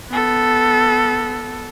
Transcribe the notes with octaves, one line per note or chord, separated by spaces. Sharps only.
B3 A4